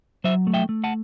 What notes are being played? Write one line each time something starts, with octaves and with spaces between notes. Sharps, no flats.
F#3 C5 E5
A3
E5 G5
A3
F#5 A5